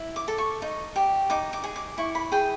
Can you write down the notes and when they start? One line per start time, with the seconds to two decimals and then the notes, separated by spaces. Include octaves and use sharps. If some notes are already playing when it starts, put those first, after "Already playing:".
Already playing: E4
0.16 D6
0.28 A4
0.38 C#6
0.62 D#4
0.96 G4
1.30 D#4 D6
1.53 D6
1.64 G#4
1.76 D6
1.98 E4 C#6
2.15 B5
2.32 G#4 G5